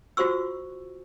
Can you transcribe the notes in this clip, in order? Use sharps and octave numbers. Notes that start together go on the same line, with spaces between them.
F4 F#4 C5 C#6 E6